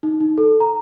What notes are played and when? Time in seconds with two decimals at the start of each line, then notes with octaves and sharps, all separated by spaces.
0.03 D#4
0.20 D#4
0.38 A4
0.60 A#5